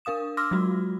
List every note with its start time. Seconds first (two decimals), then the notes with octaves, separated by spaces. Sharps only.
0.05 D4 A#4 F5 D#6 E7
0.37 C6 D6 E6 F6 A#6
0.51 F#3 G#3 F4 F#4